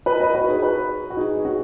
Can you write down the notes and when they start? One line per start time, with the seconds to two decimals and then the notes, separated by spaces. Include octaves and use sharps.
0.06 B4 D#5
0.20 B4 D#5
0.34 F#4 B4
0.48 D#4 G#4
0.62 F#4 B4
1.10 F#4
1.17 D#4 G#4
1.37 G#4
1.45 C#4 F#4